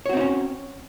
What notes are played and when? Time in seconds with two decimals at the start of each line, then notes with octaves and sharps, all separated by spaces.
0.06 C#5
0.09 F#4
0.13 C4
0.17 D#4
0.21 C#4